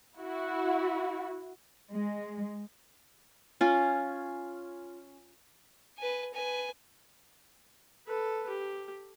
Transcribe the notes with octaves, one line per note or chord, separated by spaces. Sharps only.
E4 F#4
G#3
C#4 F4
B4 G#5
B4 G#5
A4 B4
G4